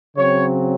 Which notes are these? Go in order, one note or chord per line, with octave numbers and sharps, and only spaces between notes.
C#3 F#3 C4 C#5